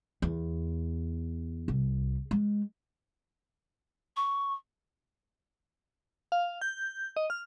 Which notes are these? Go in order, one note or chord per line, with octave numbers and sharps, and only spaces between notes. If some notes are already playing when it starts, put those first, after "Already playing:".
E2
C2
G#3
C#6
F5
G6
D#5
F6